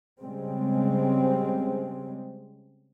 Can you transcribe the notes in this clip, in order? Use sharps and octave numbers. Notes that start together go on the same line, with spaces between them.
C#3 G3 G#3 C4